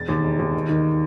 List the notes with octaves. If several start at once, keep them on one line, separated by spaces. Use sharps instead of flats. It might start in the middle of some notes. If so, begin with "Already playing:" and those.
Already playing: E1 A6
D#2
E1
D#2
D#3
D#3